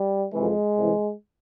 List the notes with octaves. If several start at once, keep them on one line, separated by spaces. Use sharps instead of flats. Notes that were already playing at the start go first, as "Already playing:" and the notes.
Already playing: G3
F2 C3 E3 G#3
C2 C3 E3